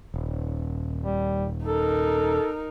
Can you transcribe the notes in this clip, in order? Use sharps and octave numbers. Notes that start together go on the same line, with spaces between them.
D#1
G3
D#4 A4 A#4